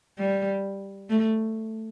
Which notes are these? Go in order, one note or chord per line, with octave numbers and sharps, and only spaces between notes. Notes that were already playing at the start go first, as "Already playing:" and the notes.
G3
A3